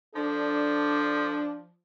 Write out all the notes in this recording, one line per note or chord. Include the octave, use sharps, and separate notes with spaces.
F3 D4 A4